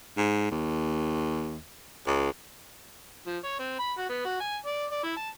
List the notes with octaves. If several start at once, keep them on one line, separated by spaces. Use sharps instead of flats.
G#2
D#2
C#2
F3
C#5
C4
B5
F#4
B3
F#4
G#5
D5
D5
E4
A5